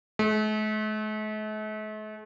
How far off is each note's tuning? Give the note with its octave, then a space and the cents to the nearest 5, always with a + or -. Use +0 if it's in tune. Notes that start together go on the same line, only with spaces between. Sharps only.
A3 -45